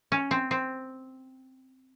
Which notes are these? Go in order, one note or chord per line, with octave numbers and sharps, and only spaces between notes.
C#4
C4
C4